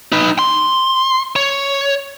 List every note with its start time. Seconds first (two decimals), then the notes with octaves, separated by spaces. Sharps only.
0.12 D#4 B4
0.39 C6
1.36 C#5